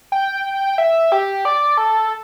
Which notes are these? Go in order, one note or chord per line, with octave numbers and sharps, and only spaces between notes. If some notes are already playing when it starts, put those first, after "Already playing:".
G5
E5
G4
D5
A4